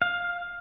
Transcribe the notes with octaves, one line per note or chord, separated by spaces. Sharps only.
F5